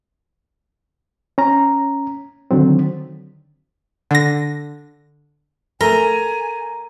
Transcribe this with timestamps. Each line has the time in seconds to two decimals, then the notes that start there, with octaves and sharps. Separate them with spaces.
1.38 C#4 A#5
2.51 D3 D#3 F#3 C4
4.11 D3 A#6
5.81 A3 A#4 G#5 A#5 A#6